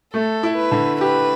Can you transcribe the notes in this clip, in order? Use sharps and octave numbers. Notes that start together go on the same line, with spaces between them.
A3 A4
E4
B4
D3
G4 B4